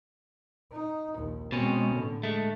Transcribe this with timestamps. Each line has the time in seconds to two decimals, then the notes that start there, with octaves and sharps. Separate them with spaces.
0.72 D#4
1.16 A#1 D#2
1.52 B2 G#3 C4 C#4
1.92 A2 D3
2.23 G#3 A3